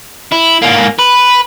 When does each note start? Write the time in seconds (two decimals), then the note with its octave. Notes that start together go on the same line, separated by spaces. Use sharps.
0.32 E4
0.63 G#2 A#3
0.99 B4